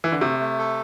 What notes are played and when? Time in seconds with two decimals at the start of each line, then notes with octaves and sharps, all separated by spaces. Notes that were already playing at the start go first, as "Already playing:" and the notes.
0.04 E3
0.12 D3
0.21 C3 A3
0.40 A3
0.59 A4